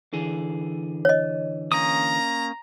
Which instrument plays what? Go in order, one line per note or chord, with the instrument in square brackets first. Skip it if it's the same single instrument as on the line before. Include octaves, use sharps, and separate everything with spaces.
[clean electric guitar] D3 E3 G#4
[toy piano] C#5 D#5
[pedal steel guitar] A#3 C#4 D#6 [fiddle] A#5